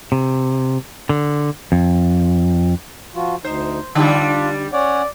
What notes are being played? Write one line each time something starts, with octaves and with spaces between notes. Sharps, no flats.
C3
D3
F2
F3 F4 F#4
D2 D#4 C5
D3 G3 D4 F4
C#4 C#5 D5 F#5